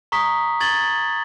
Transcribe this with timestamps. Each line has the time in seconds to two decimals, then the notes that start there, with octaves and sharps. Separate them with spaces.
0.12 A#5 C#6 D#6 B6
0.60 C#6 G#6 A6 F#7 G7